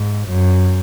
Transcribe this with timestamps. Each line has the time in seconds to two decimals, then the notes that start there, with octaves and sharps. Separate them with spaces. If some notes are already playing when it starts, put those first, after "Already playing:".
Already playing: G#2
0.29 F#2